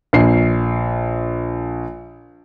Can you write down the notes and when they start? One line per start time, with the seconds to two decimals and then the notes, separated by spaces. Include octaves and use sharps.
0.13 A#1 C7